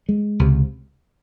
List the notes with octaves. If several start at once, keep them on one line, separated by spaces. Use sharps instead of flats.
G#3
C#2 C3